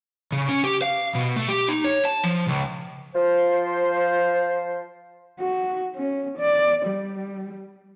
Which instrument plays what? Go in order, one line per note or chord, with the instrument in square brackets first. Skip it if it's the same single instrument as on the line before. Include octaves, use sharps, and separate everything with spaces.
[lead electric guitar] C#3
C#4
G4
F5
B2
A3
G4
D#4
C#5
A5
F3
C#2
[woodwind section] F3 C5
[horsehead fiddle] F#4
C#4
D5
G3